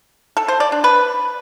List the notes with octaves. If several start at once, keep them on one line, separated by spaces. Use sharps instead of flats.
A4
C5
D5
D4
B4